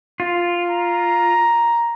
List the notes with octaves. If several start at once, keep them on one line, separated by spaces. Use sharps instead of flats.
F4
A#5